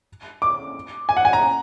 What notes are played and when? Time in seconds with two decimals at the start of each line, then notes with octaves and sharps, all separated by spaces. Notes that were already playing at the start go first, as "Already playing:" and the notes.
0.42 D6
1.09 G#5
1.17 F#5
1.25 G#5
1.33 A#5